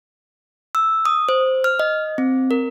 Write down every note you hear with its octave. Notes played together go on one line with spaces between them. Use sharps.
E6
D#6
C5
F6
D#5
C4
A#4